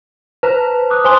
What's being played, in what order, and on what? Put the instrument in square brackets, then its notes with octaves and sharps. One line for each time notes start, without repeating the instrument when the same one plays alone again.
[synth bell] B4 C5 [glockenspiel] A5 A#5
[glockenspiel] D6 D#6 F#6
[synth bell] C5 G#5 G7 [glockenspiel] C6 D#6